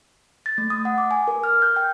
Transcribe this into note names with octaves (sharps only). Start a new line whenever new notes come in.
A6
A3
D#6
F#5
D6
G#5
A#4
F6
G6
G5